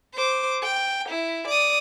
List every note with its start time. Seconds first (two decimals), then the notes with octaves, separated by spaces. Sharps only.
0.14 C5 D6
0.63 G5
1.09 E4
1.48 D5 D#6